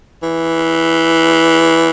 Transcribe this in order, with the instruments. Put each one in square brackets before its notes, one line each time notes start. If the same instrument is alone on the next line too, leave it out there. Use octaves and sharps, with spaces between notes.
[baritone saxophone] E3